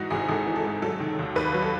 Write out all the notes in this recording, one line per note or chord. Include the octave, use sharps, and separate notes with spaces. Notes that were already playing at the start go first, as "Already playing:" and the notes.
Already playing: G#2 E3 D#4 F#4
G#1 G#4
G#1 A4
E3
A4
G#2
F#3 A4
D#3
D#2
D#2 B4
F#3
A4